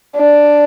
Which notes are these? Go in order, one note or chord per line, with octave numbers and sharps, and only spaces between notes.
D4